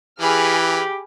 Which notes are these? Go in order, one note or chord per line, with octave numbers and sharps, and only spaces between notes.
E3 G4 G#4 B5 F6